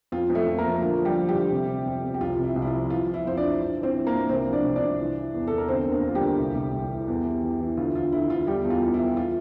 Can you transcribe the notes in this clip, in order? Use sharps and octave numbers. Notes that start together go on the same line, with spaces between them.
F2 F4
F2
A3 A4
F2
A#3 A#4
F3
D2 F4
F3
G3 G4
F3
D2 G3 G4
C3
C3
F2
F2
G4
C2 F4
C3
E4
C2
E4
F4
F3
E3 F4
E3
E4
F2 C5
E3 D4 D5
G2
E3
C4 C5
E3
A#3 A#4
G2
C2 C4 C5
F3
D4 D5
C2
D4 D5
C2
E3
E3
E2
E2 A4
A#4
D2 C4 C5
D3
A#3 A#4
D2 F4
G3 G4
D2
C2
C2
C2
E3
E2
E3
E3
E3
D2 F4
D2 F4
D3 E4
D2 F4
E2 G3 G4
E2
F4
E3
E4
E3
F4